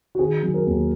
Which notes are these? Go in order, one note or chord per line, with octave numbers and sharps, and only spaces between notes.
F#4
D#3 G#4
F#3
A#4
D#2